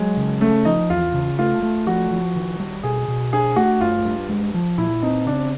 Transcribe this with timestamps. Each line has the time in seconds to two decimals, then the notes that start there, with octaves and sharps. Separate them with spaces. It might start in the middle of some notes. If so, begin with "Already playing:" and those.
Already playing: F#3 G#3
0.17 C#3
0.41 A3 C#4
0.65 F3 D#4
0.90 E2 F4
1.14 C#3
1.39 A3 F4
1.63 A3
1.87 F3 F#4
2.11 F3
2.36 D#3
2.60 G3
2.83 B2 G#4
3.08 B2
3.33 D4 G#4
3.56 A3 F#4
3.81 G2 F4
4.05 G2
4.29 G#3
4.54 F3
4.78 A#2 E4
5.02 C4 D#4
5.26 C#3 D4